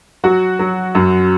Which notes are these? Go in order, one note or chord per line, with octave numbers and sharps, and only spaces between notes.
F#3 F#4
F#3
F#2